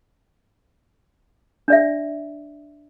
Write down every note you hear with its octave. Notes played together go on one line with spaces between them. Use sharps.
D4 D5 E5